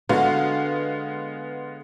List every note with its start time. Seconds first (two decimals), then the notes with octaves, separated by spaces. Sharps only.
0.09 D3 G#3 B3 F#4 F5